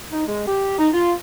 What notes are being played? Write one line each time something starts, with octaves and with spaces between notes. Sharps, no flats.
D#4
G#3
G4
D#4
F4